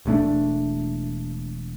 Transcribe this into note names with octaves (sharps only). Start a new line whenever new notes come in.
E1 G2 A3 D4